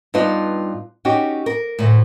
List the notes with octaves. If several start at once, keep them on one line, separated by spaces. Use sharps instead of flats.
G2 B3 D#4 F4
C#4 D#4 F#4 G4
A#4
D2 A2